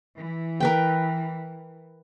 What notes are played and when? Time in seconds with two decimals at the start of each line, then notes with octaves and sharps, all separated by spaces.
0.17 E3
0.60 A#4 B4 G5